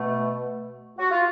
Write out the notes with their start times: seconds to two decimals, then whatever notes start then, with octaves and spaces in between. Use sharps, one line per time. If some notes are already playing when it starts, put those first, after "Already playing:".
Already playing: B2 A3
0.99 F#4
1.11 F4